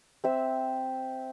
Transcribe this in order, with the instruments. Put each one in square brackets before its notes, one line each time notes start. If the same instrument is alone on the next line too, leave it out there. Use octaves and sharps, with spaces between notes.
[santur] C4 E5